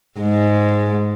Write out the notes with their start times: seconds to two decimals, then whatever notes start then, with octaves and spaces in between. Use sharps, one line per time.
0.20 G#2 G#3